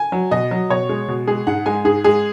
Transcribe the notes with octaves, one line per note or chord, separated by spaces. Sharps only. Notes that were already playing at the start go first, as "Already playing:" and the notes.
Already playing: G#5
F#3
B2 D#5
F#3
B2 C#5
G#3
B2
G#3 G#4
G#2 F#5
G#3 G#5
G#2 G#4
G#3 G#4